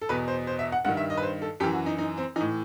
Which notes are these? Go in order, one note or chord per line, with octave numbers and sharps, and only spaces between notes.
A4
E2 B2 B4
C5
C5
E5
F#5
G2 D#3 F#5
E5
D#5
B4
C5
A4
F#2 E3 G4
F#4
D#4
D#4
C4
A2 E3 D#4